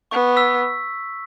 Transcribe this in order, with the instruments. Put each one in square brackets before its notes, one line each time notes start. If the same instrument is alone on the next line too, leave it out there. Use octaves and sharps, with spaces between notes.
[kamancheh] B3 [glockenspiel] C#6
[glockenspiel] E6 B6